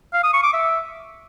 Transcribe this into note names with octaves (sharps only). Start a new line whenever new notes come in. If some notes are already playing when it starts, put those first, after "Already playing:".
F5
D#6
C#6
D6
E5